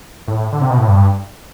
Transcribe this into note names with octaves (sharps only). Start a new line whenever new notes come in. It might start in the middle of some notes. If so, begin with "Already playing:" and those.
A2
D3
C3
B2
A2
G2